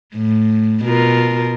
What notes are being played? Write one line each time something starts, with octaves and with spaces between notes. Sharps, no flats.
A2
B2 F4 A#4